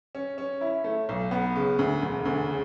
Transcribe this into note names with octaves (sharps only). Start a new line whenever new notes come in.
C#4
C#4
E4
A3
B1
B3
C#3
D2
E1
D2
C#3